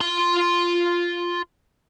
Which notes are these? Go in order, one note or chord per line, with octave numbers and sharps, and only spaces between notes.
F4 C6